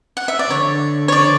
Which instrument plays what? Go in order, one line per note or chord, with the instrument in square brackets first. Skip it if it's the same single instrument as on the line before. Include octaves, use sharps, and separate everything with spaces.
[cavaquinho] F#5
E5
D5
[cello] D3 [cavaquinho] C#5
[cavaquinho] C#5
D5